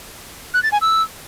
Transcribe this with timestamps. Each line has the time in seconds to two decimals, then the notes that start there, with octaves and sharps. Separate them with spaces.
0.54 F#6
0.63 A6
0.72 G#5
0.81 E6